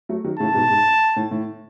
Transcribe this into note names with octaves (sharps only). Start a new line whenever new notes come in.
F#3 A3
D#3 F#3
A2 C#3 A5
G#2 B2
G#2
A2
A2